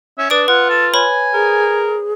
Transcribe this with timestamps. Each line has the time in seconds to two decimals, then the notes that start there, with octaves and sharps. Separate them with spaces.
0.18 C#4 E5
0.30 D4 B4 D5 D#6 D7
0.48 F4 B4 F#5
0.70 A4
0.94 B4 C#5 G#5 B5
1.34 G#4 A#4